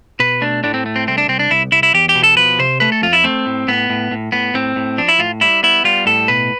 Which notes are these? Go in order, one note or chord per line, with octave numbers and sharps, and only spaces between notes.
B2 B4
A3 D4
A2 D4
C4
A3
C4
C2 C4
D4
C2 C4
D4
C2 E4
C2 E4
E4
E2 G4
G4
B2
A4
F3 B4
C3 C5
A3 B4
A4
F2 F4
E4
A3 C4
A2
A2 B3
A2
A2
A2 B3
A2 C4
A2
F3 D4
E4
A2 F4
G3 E4
B3 E4
G3 F4
A2 A4
B2 B4